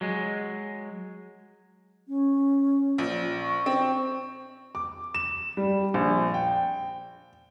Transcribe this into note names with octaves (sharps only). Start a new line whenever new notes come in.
F#3 G#3
C#4
A#1
C#6
C4
D6
E7
G3
A#1
G5